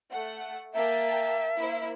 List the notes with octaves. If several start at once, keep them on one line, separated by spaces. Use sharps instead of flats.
A3 F#5
A#3 E5 G5 A5
A#3 E4 C5